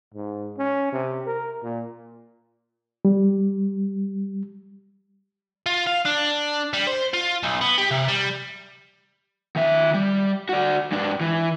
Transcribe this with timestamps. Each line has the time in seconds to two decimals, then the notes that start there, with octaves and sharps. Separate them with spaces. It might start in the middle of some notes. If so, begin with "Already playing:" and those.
0.14 G#2
0.58 C#4
0.92 C3
1.26 A#4
1.63 A#2
3.05 G3
5.66 F4
5.87 F5
6.05 D4
6.73 G3
6.87 C5
7.13 F4
7.43 B1
7.61 B3
7.78 G4
7.91 C3
8.08 G3
9.56 D#3 E5
9.94 G3
10.49 F#4 D5
10.92 G#2 D4
11.21 E3